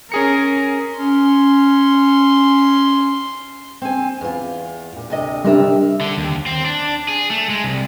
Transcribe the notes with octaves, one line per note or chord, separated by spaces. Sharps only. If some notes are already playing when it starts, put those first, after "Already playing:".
C#4 G#4 A#4 C#7
C#4 C6
C4 G#5
E2 F4
A#2
D2 C3 D#5
C3 G3 D4 A#4 E5
D3
D#2
C4
D4
G#4
A3
G#3
C2